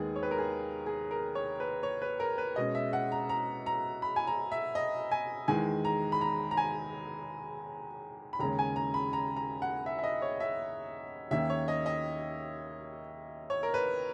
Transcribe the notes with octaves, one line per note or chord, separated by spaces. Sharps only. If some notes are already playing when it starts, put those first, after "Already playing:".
Already playing: D#2 D#3 G#3 B3 G#4
C#5
B4
A#4
G#4
G#4
A#4
C#5
B4
C#5
B4
A#4
B4
B2 G#3 C#4 D#5
E5
F#5
A#5
A#5
A#5
B5
G#5
A#5
E5
D#5
G#5
E2 D#3 G#3 G#5
A#5
B5
A#5
A#5
G#5
B5
D#2 C#3 G#3 C#4 A#5
G#5
A#5
B5
A#5
A#5
F#5
E5
E5
D#5
C#5
E5
D#2 D#3 A#3 C#4 E5
C#5
D#5
D#5
C#5
A#4
B4